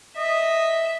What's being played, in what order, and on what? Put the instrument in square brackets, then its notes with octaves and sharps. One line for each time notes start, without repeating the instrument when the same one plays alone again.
[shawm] D#5 [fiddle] E5